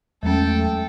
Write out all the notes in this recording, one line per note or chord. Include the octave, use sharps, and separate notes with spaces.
E2 F#3 G#3 A3 C#4 A4 G5